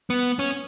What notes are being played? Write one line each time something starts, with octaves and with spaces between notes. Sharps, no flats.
B3
C#4